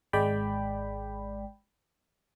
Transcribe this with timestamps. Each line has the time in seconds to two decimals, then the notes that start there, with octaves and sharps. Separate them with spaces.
0.13 G#1 G#3 D5 G5 B5